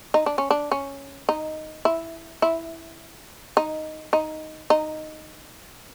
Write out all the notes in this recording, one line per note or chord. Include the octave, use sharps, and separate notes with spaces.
D#4
D4
C#4
D4
C#4
D#4
E4
E4
D#4
D#4
D#4